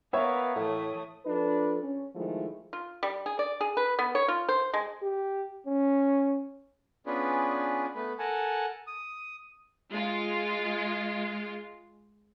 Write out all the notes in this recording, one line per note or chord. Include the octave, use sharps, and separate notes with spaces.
B3 A#4 B4 C#5 E5 F5
A2 E3 A3 D#6
F3 D4 A4 B4
C#4
D#3 F3 G#3 A3 E4
F4
G3
G#4
D5
G#4
B4
B3
C#5
F4
C5
G#3
G4
C#4
B3 C#4 D4 F4 G#4 B4
A3 B3 B4
A4 A#4 F#5 G#5 A5
D#6
G#3 F4